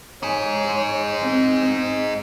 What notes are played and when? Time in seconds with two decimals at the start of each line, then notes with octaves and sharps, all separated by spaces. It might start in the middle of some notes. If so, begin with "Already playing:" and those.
0.23 D#4 G#4 C#5
1.21 C4